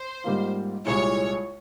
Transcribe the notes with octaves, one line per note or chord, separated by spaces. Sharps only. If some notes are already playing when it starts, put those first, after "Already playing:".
Already playing: C5
G#2 G3 A#3 F4
C2 A#2 G#3 E4 C#5